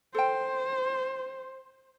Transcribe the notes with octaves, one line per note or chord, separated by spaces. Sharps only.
A4 C5 G5